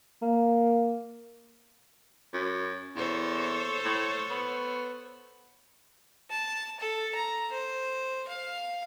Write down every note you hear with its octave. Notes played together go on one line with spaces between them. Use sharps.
A#3
F#2
E2 A4 C5 C#5
A2
B3
A5
A4
A#5
C5
F5